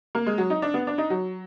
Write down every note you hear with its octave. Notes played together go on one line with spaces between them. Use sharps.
A#3
G#3
F#3
D#4
D4
B3
D4
D#4
F#3